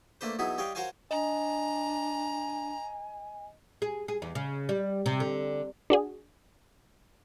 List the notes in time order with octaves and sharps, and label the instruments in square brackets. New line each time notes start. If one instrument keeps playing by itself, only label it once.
[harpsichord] A3 A#3 D4 B4 C5
F#3 B3 D#4 E4 G#4
G3 C#5 D#5 F5 G5
F#4 A#4 C5 C#5 F5 G#5
[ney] D4 [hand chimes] D#5 [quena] G#5 [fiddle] A#5
[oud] G#4
G#4
E2
C#3
G3
C3
D3
[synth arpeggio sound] D4 F#4 G#4